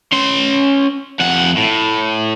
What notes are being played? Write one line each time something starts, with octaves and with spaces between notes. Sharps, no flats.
C#4 C6
F2 F#5
A2